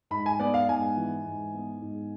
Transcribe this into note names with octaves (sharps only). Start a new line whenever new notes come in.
G#2 B5
G#5
B3 D5
F5
G#2 G#5
E3
G#2
B3
G#2